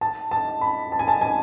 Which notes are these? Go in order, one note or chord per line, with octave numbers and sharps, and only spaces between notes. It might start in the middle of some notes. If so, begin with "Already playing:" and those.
A5
A5
B5
A5
G#5
A5
G#5